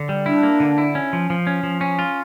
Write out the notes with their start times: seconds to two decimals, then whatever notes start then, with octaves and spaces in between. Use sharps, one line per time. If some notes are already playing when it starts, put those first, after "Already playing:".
Already playing: D3
0.09 G3
0.26 D4 E4
0.43 A#3
0.60 D3
0.78 E4
0.95 C#4
1.13 F3
1.30 F3
1.47 C#4
1.63 F3
1.81 C#4
1.99 F4